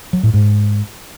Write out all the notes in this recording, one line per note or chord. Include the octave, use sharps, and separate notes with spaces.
F#3
A2
G#2